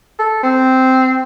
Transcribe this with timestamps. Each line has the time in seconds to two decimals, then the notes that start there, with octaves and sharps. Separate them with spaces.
0.19 A4
0.44 C4